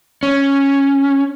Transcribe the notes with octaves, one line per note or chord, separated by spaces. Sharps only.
C#4